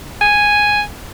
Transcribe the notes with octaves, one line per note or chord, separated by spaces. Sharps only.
G#5